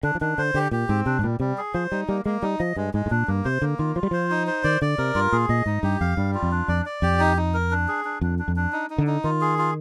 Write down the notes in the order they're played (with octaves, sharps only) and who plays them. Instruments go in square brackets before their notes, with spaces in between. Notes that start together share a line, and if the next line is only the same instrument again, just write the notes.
[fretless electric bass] D3 [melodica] D4
[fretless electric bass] F3
[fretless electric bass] D#3 [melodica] D4
[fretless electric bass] D3 [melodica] C5
[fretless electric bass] D3 [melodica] G4
[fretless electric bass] A#2 [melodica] G4
[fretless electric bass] G#2 [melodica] C4
[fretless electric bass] C3 [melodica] D4
[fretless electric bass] G#2
[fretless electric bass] A#2 [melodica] G3
[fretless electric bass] C3 [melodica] G3
[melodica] G#4
[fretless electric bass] F3 [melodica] C5
[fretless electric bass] G3 [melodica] D#4
[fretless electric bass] G3 [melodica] A#3
[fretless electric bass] G#3 [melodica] A#3
[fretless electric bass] G3 [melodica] D#4
[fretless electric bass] F3 [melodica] D#5
[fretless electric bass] G2 [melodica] G#3
[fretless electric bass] G#2 [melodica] G#3
[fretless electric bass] G#2
[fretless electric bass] A#2 [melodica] D4
[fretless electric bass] G2 [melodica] A#3
[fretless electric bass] C3 [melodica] C5
[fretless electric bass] D3 [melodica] A#3
[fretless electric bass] D#3 [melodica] F4
[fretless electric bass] F3 [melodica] F4
[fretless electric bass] G3
[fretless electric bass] F3 [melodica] C5
[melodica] D#4
C5
[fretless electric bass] D#3 [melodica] D5
[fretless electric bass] D3 [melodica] D5
[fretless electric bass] C3 [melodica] A#4
[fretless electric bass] G2 [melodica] F4
[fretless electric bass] A#2 [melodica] G#4
[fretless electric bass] A#2 [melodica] D#5
[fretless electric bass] G#2 [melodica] D#4
[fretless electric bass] G2 [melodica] G4
[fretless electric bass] F2 [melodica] F5
[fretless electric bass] G2 [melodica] G3
[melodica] F4
[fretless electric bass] F2
[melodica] D4
[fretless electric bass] F2 [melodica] D5
[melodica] D5
[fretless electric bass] F2 [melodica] G4
[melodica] D#4
D#4
A#4
D4
G#4
D4
[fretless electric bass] F2 [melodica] D4
[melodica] D4
[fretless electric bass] F2
[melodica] D4
D#4
D#4
[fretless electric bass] D3
[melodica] D#4
[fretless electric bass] D#3 [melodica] F4
[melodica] G#4
F4